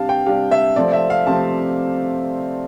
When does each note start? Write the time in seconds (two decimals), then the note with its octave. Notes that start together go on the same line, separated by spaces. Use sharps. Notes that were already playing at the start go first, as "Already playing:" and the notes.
Already playing: C3 G3 D4 G4 F5 A5
0.09 G5
0.26 C3 G3 D4 G4 F5
0.51 E5
0.76 C3 F3 A3 C4 D5
0.93 E5
1.10 F5
1.26 C3 F3 A3 C4 A5